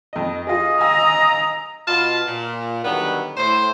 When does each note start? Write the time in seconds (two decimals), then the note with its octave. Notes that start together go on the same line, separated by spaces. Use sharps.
0.13 F2 D#5
0.47 F4 G#4 D#5
0.81 F5 G#5 A#5 E6
1.87 B2 F4 B4 D#5 F5 A5
2.26 A#2
2.84 D3 D#3 F#3 G3 B3
3.37 A2 C5